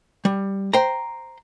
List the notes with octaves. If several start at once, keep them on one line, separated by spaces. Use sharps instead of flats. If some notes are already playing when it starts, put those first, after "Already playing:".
G3
C5 G5 A#5